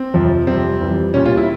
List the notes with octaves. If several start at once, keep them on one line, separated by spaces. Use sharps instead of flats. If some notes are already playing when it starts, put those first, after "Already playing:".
Already playing: C4
F2 C3 F3
F2 C3 G3 C4
F2 E3 G3
A#2 G3 C#4
F4
E4